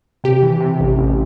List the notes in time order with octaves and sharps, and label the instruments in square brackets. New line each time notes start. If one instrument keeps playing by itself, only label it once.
[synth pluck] C3 G4
E3
C3
A1
A1